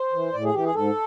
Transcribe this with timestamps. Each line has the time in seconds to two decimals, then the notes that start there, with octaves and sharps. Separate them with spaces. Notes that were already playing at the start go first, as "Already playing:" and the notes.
Already playing: C5
0.13 E3
0.33 A2 D5
0.44 G#4
0.53 E3 G4
0.64 G#4
0.74 G#2 A4